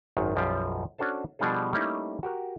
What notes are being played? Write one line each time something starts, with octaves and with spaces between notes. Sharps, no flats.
G#1 F#2 D#3
B1 F#2 F3 G3 F4 G4
C#4 D4 F#4 A4 C5 A5
B2 F3 G3 D4 G#4 A4
G3 A3 A#3 C#4 D#4 E4
F#4 G4 A#4